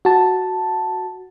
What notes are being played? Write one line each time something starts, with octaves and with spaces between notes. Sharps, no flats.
F#4 A5